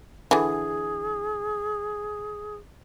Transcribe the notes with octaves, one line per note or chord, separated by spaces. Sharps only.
D3 E3 G#4